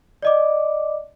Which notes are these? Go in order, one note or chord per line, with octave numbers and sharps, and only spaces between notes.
D5 D#5 D6